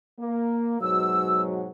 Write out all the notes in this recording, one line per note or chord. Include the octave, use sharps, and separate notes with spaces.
A#3
G#2 B2 F#3 E6